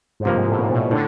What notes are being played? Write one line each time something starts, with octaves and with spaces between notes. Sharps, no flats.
G#2
G2 C3 F3 A#3
G#2
A2
A#2
B2
A2 D3